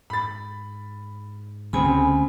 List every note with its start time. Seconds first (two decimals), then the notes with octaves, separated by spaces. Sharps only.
0.10 G#2 B5 A6
1.73 D2 C#3 C4 G#5 B5